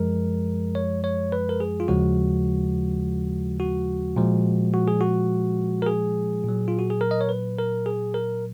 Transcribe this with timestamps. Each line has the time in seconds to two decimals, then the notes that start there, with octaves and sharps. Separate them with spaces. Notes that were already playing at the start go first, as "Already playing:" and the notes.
Already playing: F#2 F3 G#3 A#4
0.75 C#5
1.04 C#5
1.32 B4
1.49 A#4
1.60 G#4
1.80 F4
1.88 D#2 C#3 F3 G#3 F#4
3.60 F#4
4.16 A#2 F3 G#3
4.74 F#4
4.88 G#4
5.01 F#4
5.82 A#4
5.87 G#4
6.44 A#2 F#3
6.68 F4
6.79 F#4
6.90 G#4
7.01 A#4
7.11 D#5
7.21 C#5
7.29 B4
7.59 A#4
7.86 G#4
8.14 A#4